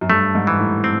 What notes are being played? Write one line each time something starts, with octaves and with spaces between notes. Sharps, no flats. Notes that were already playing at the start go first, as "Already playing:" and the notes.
F#2
G2 A3
G#2
E3
A2
C4